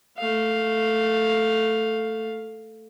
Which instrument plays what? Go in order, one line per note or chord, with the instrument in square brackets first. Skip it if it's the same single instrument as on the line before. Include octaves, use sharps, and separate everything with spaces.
[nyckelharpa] A3 F5